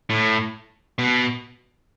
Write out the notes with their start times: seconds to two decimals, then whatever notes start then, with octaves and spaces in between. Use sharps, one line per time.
0.10 A2
0.99 B2